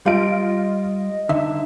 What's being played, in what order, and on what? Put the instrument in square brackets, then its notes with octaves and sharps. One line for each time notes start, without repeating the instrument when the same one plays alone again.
[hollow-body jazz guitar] G3 [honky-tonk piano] F4 D7 [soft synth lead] D#5
[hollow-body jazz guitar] D3 [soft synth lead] D#4 [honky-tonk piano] E5